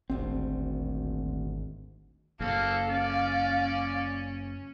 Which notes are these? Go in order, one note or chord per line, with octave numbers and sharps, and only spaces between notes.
D#1 G#1 D2 C4
F#1 A#3 A4 F5
C#4 D5